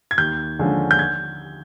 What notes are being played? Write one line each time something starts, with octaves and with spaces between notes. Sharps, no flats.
G#6
D#2 G6
D3 F3 G#3 C#4
G6
G#6